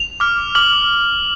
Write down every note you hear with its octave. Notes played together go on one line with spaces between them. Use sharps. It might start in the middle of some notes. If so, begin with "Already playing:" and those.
Already playing: F7
D6 F6
D6 F6 F#7